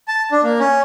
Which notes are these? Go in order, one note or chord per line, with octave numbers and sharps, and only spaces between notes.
A5
D4
A#3
C#4